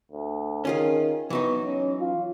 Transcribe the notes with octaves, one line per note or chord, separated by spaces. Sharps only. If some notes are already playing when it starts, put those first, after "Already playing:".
D2
D#3 C#4 F4 G#4
E3 F#3 B3 D#4
C#4
F4